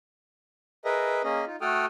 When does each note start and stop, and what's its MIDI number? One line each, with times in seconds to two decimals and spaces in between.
0.85 1.22 68
0.85 1.22 70
0.85 1.22 71
0.85 1.22 75
0.85 1.22 76
1.24 1.45 58
1.24 1.45 61
1.24 1.45 68
1.24 1.45 75
1.47 1.56 63
1.47 1.56 65
1.61 1.86 57
1.61 1.86 66
1.61 1.86 69
1.61 1.86 79
1.61 1.86 87
1.61 1.86 89